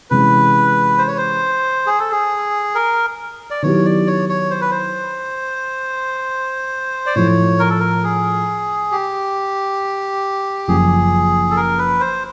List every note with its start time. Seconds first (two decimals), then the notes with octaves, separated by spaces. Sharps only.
0.10 C3 E3 G#3 C#4 B4
0.98 C5
1.08 C#5
1.17 C5
1.87 G#4
1.99 A4
2.12 G#4
2.75 A#4
3.51 D5
3.62 D#3 F#3 B3 E4 G4 C#5
3.85 D5
4.07 C#5
4.29 C#5
4.51 C5
4.61 B4
4.71 C5
7.06 D5
7.15 A2 F3 A3 C#5
7.59 A#4
7.70 A4
7.80 A#4
8.04 G#4
8.92 G4
10.68 F#1 F#2 C#3 F3 G#4
11.51 A4
11.57 A#4
11.79 B4
12.00 C5